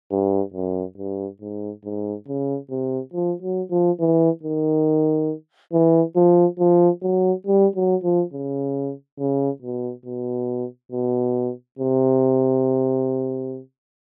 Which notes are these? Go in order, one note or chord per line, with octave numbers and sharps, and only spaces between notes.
G2
F#2
G2
G#2
G#2
C#3
C3
F3
F#3
F3
E3
D#3
E3
F3
F3
F#3
G3
F#3
F3
C#3
C#3
B2
B2
B2
C3